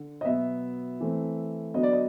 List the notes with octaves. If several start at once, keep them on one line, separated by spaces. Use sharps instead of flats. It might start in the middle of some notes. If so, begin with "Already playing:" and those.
Already playing: D3
D#5
B2 F#3 B3 E5
E3 A3 C4
D3 F#3 B3 D#5
D5
D#5